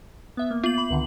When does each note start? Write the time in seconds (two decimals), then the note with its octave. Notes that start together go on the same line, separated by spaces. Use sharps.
0.37 B3 E5
0.51 A#3
0.64 B3 F4 F#7
0.78 B5
0.90 C#2 D3 D#3